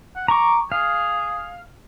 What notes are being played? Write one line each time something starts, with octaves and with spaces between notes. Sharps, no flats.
F#5
A#5 C#6 D6
G#4 F5